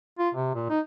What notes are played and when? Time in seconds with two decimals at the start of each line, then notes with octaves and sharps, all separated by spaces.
0.19 F4
0.35 C3
0.55 A#2
0.70 D#4